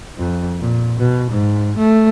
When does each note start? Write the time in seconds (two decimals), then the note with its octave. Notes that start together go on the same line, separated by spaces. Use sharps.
0.18 F2
0.60 A#2
0.99 B2
1.31 G#2
1.78 A3